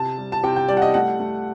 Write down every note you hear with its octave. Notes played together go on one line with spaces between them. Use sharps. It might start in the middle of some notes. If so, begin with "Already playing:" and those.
Already playing: C3 A5
G3
A5
C3 G5
G5
G3 D5
F#5
D#5
A3 F#5
A3